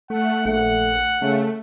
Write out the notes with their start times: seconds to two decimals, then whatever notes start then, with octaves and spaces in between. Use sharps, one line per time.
0.10 A3 F#5
0.46 A#1 A3 F#5
1.22 C#3 A3